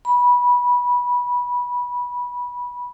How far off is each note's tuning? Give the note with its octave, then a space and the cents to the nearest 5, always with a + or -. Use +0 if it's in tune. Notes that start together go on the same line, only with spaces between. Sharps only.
B5 -20